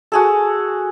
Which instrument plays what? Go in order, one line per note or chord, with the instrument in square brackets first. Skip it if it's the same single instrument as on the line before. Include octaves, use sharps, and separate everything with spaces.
[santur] F#4 G#4 A4